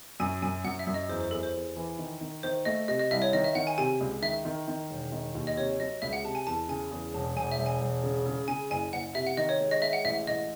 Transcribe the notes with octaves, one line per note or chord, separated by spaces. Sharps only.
F#2 G#5
F#2 G#5
F#2 F#5
E5
F#2
D#5
E2 C5
C5
E2 A4
C5
E2
E3
D#3
D#3
D#3 C5
A3 D#5
C3 D#5
D#5
C2 E5
C#5
D#3 D#5
E5
D#3 F#5
G#5
C3 G#5
C#2
D#3 E5
D#3
D#3
E1
D#3
D#2
D#5
C3 C#5
F#3 D#5
C#2 E5
F#5
C3 A5
G#5
E2 A5
C#3 G#5
E2
E1 A5
E1 G#5
E5
E1
G#5
E1
C#3
C#3
C#3 G#5
F#1 G#5
F#1 F#5
C3 E5
F#5
D#3 D#5
C#5
G#3
D#5
G#3 E5
F#5
A1 E5
A1 D#5